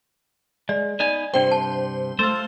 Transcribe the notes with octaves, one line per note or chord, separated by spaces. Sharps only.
G#3 D5
B3 D#4 D5 G#5
G2 C3 D4 C5 G5
A5
A3 F4 C5